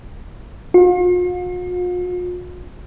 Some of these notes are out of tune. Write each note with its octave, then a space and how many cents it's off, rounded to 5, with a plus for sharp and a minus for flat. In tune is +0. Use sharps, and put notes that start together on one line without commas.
F4 +45